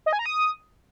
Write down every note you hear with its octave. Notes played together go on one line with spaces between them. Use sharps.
D#5
G#5
A#5
D#6